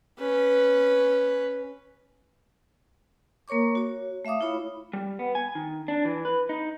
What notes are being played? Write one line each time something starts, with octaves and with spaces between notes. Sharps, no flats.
C#4 B4
A#3 A#4 C#5 C#6 D6
F#4 C#5
A3 E5 F5 D6 D#6
E4 F4 C#5 B5
G3
B3
G#5
D#3
D4
E3
B4
D#4